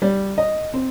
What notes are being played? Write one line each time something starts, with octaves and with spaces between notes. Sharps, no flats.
G3
D#5
C4